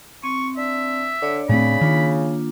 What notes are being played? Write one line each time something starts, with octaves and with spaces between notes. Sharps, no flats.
C4 C#6
D4 E5
D3 D4 C#5 D5
A2 C#3 A3 C4 B5
D#3 A#3 D4 F4